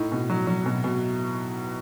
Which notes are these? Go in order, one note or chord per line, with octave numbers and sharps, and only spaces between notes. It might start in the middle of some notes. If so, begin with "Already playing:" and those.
Already playing: A2 D#4
B2
F#3
F#3
B2
B2